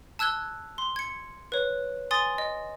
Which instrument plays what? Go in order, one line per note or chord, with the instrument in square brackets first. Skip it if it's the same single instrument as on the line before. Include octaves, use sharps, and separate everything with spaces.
[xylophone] A5 E6 F#6 G#6 G7
C6
G#6 C#7
B4 C#5
G#5 C6 D#6 A6
D#5